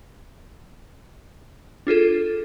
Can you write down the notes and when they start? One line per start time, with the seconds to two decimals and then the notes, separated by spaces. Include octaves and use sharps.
1.87 D4 F4 G#4 A4